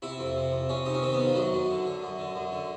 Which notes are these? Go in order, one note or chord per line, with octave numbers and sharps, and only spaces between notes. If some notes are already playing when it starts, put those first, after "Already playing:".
C3 E4
F2
C3
F2
C3 C#4
C3 D#4
C#4
D#3 C4
B3
D#3
F3
F#2 F#3
F#2
D3
D3
F#2
D3
F#2
D3